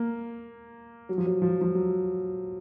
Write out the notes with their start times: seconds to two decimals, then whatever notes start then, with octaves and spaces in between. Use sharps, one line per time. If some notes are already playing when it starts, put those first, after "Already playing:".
Already playing: A#3
1.09 F#3
1.18 F3
1.27 F#3
1.42 F3
1.61 F3
1.75 F#3